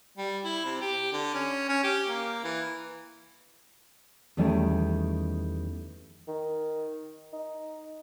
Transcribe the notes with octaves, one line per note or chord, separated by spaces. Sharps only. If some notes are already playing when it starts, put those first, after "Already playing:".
G3
E4
C3
G4
D3
C#4
C#4
G4
A#3
E3
E2 D#3 G3 A3 C#4 E4
D#3
D#4